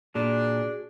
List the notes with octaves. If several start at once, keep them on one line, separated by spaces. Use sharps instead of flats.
A#2 D4 F#4 G#4